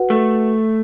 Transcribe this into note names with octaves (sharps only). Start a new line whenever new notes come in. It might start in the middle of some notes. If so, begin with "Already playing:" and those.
Already playing: F#4 B4 F#5
A3